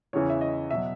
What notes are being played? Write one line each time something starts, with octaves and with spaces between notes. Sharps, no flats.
E2 C#3 E3 C#5
E5
D#5
B2 F#3 E5